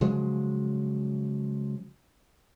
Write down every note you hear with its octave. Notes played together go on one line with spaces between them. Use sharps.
C#3 F3 F#3 G#3